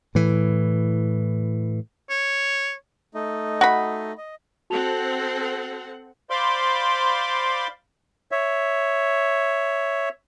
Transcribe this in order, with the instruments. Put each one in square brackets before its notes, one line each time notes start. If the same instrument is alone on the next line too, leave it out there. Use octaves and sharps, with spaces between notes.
[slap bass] A2 E3
[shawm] C#5
[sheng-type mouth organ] A3 D#4 D#5
[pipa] F#4 B5
[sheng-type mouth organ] D#5
[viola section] C4 A4 F#5 [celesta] F#4 A5 F7
[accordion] C5 D5 F5 B5 C6 D6
[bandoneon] C#5 E5